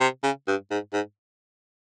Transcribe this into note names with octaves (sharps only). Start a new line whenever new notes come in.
C3
C#3
G2
G#2
G#2